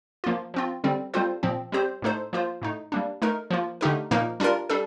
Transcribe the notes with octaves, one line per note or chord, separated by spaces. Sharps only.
F3 A#3 F4
F3 C4 F4
D3 G3 C4
G3 C4 F4 A4 C5
A#2 F3 C4
G3 C4 G4 C5
A2 A3 D#4 A4 C5
F3 A#3 F4 C5
A2 A3 D#4
G3 A#3 D4
A3 D#4 A#4
F3 A#3 F4
D3 A3 D#4 G4 A#4
A#2 F3 A#3 D#4 A#4
G3 D4 F4 A#4
G3 D4 A4